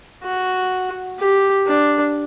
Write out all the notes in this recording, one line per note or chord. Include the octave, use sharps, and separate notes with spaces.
F#4
G4
D4